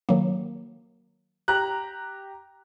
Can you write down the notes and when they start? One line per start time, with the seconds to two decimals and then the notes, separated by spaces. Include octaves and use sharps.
0.09 D#3 F#3 A#3
1.48 G4 A#5 F#6